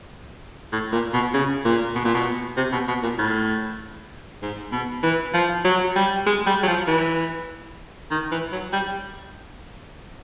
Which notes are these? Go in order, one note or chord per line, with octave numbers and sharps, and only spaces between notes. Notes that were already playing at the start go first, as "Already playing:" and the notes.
A2
A#2
B2
C#3
A#2
B2
A#2
B2
C3
B2
B2
A#2
A2
G#2
B2
E3
F3
F#3
G3
G#3
G3
F#3
F3
E3
D#3
E3
F#3
G3